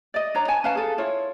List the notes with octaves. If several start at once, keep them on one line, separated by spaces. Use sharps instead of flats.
D5 D#5
D4 C#5 A#5
C#5 G#5 A5
C#4 B4 F5 A5
G#4 A4
E4 F4 C#5